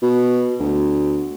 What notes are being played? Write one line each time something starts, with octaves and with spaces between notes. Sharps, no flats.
B2
D2